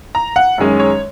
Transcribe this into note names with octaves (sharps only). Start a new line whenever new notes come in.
A#5
F#5
F#2 D#3 G#3 C#4
C#5